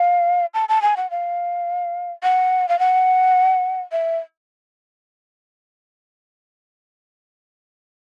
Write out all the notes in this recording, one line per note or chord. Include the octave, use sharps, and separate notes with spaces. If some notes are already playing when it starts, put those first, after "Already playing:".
Already playing: F5
A5
A5
G#5
F#5
F5
F#5
F5
F#5
E5